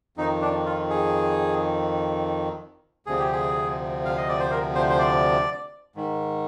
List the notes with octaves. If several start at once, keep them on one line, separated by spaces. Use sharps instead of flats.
F2 D#3 D#4
D4
F4
G#4
D2 C3 F3 G#4
G4
G#4
F5
D#5
D5
C5
A#4
C5
C5
D5
G#2 D#3